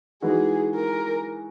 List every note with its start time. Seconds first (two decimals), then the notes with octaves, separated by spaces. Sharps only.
0.22 E3 G#3 D#4 F#4 G#4 B4
0.76 A#4